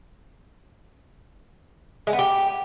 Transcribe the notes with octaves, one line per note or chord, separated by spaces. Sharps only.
G#3
B3
G4